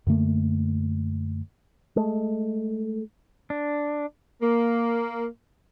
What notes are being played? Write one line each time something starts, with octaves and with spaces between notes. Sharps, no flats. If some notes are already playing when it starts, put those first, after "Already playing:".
F#2 D3 A3 A#3
G#3 A3
D4
A#3